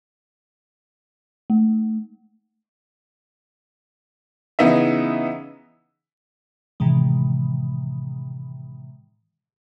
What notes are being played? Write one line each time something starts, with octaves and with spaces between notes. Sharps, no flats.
A3
C#3 E3 B3 D#4 E5
A2 C3 D#3 E3 G#3